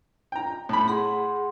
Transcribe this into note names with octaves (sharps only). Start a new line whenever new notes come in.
G5 A#5
A2 B5
G#4 F#5 C6